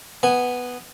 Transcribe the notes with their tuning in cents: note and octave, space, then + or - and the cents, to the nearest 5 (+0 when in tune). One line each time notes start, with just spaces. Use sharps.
B3 +0 G#5 +0